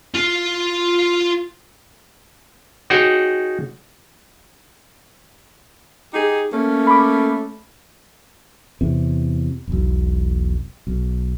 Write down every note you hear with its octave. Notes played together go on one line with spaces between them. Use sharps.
F4 F5
D#4 F#4 G#4 C#5 F#5 G5
D#4 G4 G#4
A3 A#3 C#4
B5 D6
E2 C3
E1 B1
B1